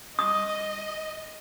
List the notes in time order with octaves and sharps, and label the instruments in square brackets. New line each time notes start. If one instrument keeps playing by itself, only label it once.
[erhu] D#5 [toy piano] D#6